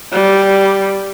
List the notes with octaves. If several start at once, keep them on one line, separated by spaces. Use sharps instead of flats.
G3